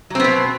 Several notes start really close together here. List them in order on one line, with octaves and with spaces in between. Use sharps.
F#3 C4 B3 B2